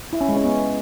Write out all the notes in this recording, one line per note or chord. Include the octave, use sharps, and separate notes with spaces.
E4
C#4
G#3
C#4
B3